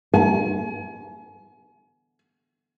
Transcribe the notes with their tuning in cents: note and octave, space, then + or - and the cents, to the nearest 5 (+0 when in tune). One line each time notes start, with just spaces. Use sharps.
G#5 +35